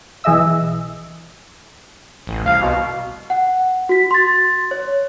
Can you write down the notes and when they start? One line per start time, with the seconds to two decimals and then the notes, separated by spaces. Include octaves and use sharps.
0.24 B1 E3 G#4 D#5 E5 E6
2.27 A1
2.46 C2 F5
2.61 B2
3.30 F#5
3.89 F#4 B6
4.11 C6 A6
4.71 C#5